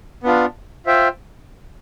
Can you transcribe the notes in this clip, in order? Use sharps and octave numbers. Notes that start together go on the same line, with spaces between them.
B3 D4 F4
F4 C5 E5 G5